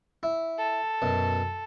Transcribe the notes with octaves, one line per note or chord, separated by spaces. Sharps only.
E4
A4
F#2 B2